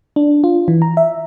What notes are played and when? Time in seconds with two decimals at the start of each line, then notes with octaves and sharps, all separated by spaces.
0.16 D4
0.44 F4
0.68 E3
0.82 A#5
0.97 E5